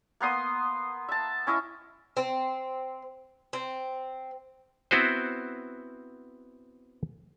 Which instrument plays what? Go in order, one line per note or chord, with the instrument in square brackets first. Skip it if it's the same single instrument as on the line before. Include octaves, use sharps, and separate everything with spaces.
[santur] A#3 B3 C6 D#6
E5 A5
C#4 E4 D#5 E5
[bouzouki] C4
C4
[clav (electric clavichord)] B3 C4 E4 F#4 B4 C5